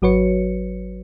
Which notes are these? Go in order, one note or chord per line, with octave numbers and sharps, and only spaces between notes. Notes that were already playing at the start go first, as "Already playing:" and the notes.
G#1 F#3 F#4 B4 C#5 C#7